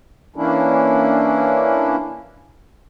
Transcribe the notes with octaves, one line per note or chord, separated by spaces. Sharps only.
E3 A#3 C#4 D4 E4